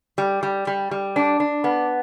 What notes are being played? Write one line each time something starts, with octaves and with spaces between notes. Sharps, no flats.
G3
G3
G3
G3
D4
D4
B3